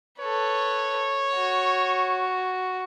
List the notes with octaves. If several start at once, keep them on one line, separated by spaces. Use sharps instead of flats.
A4 B4 C#5
F#4